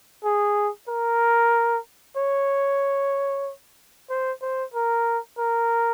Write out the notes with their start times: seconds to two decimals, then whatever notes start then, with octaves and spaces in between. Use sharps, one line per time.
0.24 G#4
0.89 A#4
2.17 C#5
4.10 C5
4.42 C5
4.74 A#4
5.38 A#4